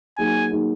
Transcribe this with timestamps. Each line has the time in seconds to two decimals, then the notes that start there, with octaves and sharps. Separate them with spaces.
0.18 F#3 A#3 D#4 G#4 G#5
0.51 F#3 A#3 D#4 G#4